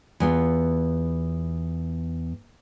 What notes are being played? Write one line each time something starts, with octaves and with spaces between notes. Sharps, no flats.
E2 B3 F4